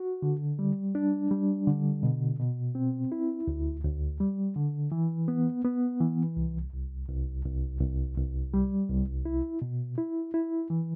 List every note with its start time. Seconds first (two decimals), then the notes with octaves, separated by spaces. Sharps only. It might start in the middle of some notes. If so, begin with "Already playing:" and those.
Already playing: F#4
0.22 D3
0.59 G3
0.95 D4
1.31 G3
1.67 D3
2.03 B2
2.39 B2
2.75 C4
3.12 E4
3.48 D2
3.84 D2
4.20 G3
4.56 D3
4.92 E3
5.28 B3
5.65 B3
6.01 E3
6.37 C2
6.73 C2
7.09 C2
7.45 C2
7.81 C2
8.18 C2
8.54 G3
8.89 C2
9.25 E4
9.62 B2
9.98 E4
10.34 E4
10.70 E3